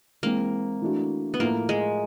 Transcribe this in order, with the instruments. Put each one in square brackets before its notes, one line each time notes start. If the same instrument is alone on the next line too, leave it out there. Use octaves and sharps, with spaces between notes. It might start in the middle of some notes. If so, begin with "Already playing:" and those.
[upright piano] E3 G#3 C4 [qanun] A#3
[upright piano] E3 A3 D4 F#4
[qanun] B3
[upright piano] A2 F3 A3 [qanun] A#3
[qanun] G#3